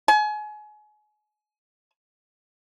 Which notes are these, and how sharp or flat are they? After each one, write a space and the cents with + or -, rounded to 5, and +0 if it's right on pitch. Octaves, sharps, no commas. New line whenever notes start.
G#5 +30